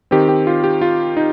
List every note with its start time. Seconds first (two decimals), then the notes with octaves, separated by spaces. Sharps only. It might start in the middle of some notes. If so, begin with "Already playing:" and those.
0.11 D#3 C4 G4
0.29 G4
0.47 F4
0.64 G4
0.81 F4
1.17 D#4